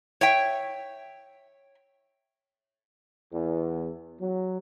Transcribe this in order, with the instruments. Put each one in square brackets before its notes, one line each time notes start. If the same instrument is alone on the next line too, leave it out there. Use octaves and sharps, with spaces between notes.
[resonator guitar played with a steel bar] C#5 E5 G5
[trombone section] E2
F#3